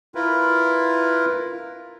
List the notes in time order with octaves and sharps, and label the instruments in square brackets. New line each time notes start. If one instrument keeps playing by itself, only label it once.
[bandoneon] E4 F4 A#4 B4